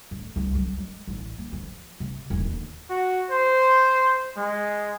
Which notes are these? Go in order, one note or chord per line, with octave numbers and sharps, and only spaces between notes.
A2
C2
F#3
G#3
A1
A#3
F3
C3
D#1
D#2
F#4
C5
G#3